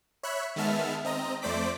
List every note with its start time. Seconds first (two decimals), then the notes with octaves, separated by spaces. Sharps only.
0.23 C#5 E5 B5 F#6
0.56 D#3 G#3 B3 E5 A5 F6
1.05 C4 D#5 A#5
1.42 F2 A3 C5 D5 D6 B6